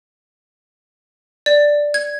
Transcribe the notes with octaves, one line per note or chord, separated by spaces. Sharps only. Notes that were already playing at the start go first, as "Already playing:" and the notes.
D5
G#6